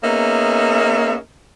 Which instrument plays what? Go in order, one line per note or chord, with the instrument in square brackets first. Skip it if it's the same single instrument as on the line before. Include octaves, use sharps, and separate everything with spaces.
[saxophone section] A#3 B3 C#4 D#4 G#4 E5